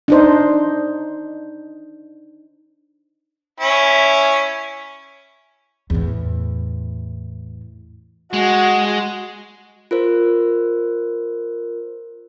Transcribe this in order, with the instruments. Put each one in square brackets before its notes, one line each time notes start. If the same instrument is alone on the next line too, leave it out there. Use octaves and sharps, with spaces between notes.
[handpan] D4 D#4 C5
[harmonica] C#4 E4
[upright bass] E2 A2
[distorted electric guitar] G#3 [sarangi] F#4
[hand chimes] F4 A#4 C5